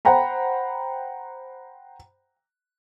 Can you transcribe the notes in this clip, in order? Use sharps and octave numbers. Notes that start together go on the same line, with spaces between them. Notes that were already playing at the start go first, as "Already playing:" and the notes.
C5 F#5 G5 A#5 B5